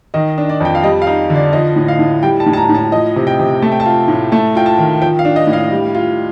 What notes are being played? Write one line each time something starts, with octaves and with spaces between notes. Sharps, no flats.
D#3 D#5
D4
D5
F2 G5
F5
G3 D#5
F5
D#4
D3
D5
F3 D#5
A2
F5
A2
G3 G5
A5
A2
A5
A#5
A2
A5
F3 D#5
C3
G5
C3
A3 A5
G5
A5
F4
A2
A3 A5
F4 G5
A5
D#3
F3 G5
F5
D4
D#5
A2
F5
G3
F4